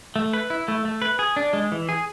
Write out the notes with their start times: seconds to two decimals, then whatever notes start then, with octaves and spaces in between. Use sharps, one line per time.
0.16 A3
0.33 B4
0.50 E4
0.68 A3
0.85 A3
1.02 B4
1.19 G#4
1.36 D4
1.53 G#3
1.72 E3
1.89 G#4